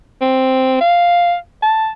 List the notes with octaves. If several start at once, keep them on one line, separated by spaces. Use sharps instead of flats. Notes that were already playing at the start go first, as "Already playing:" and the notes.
C4
F5
A5